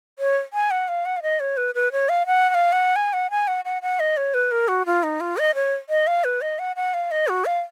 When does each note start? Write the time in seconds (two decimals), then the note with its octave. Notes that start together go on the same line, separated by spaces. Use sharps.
0.19 C#5
0.53 G#5
0.71 F#5
0.88 F5
1.05 F#5
1.17 F5
1.22 D#5
1.40 C#5
1.57 B4
1.75 B4
1.92 C#5
2.09 F5
2.27 F#5
2.49 F#5
2.54 F5
2.72 F#5
2.96 G#5
3.13 F#5
3.31 G#5
3.48 F#5
3.65 F#5
3.82 F#5
4.00 D#5
4.17 C#5
4.34 B4
4.51 A#4
4.68 F#4
4.86 F4
5.03 D#4
5.20 F4
5.38 D#5
5.55 C#5
5.89 D#5
6.07 F5
6.24 B4
6.41 D#5
6.59 F#5
6.76 F#5
6.94 F5
7.11 D#5
7.28 F#4
7.45 F5